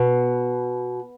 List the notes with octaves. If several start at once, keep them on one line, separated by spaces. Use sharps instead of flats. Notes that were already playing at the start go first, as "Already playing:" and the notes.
Already playing: B2